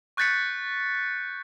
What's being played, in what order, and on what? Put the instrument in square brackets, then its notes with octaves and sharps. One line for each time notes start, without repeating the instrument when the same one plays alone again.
[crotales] C#6 F#6 G6 A6 B6 C#7